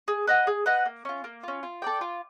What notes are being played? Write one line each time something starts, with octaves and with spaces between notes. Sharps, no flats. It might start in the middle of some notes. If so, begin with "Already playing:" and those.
G#4
B4 D#5 F#5
G#4
B4 D#5 F#5
A#3
C#4 F4
A#3
C#4 F4
F4
A4 D5 G5
F4